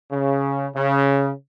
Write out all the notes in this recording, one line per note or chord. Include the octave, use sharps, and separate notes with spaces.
C#3
C#3